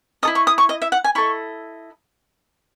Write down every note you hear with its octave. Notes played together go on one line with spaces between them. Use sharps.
E4 A4 D#5 D#6
C#6
D#6
C#6
D#5
E5
F#5
G#5
E4 A4 D#5 C#6